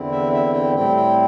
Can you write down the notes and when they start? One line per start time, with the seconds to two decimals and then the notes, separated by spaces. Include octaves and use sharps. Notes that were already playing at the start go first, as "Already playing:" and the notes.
Already playing: E2 D3 C4 E4
0.11 E5
0.33 E5
0.53 G5
0.75 A2 G3 C4 E4 G5
0.96 G5